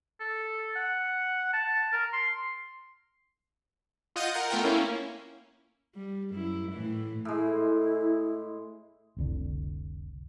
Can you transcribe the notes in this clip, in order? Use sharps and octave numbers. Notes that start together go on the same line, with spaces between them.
A4
F#5
A5
A#4
C6
F4 D#5 F#5 G6 D#7
A#4 F#5
A3 B3 F4 A#4 G5
A#3 C#4 E4
G3
F#2 E4
A2 E3
A2 G#3 E4
F1 C2 D3